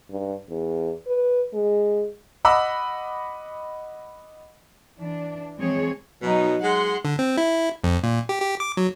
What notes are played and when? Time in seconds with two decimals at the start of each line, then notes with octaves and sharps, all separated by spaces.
0.10 G2
0.49 E2
1.07 B4
1.54 G#3
2.45 D#5 F#5 B5 D6 E6
4.98 E3 D4
5.58 E3 F3 G#3 C4 G#4 C#5
6.22 B2 F#3 D#4
6.63 G#3 F#5 C6
7.05 D3
7.19 C4
7.37 E4
7.84 F2
8.03 A#2
8.29 G4
8.41 G4
8.60 D6
8.77 F#3